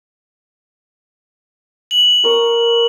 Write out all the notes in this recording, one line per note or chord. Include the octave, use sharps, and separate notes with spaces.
F#7
A#4 C#6 D#6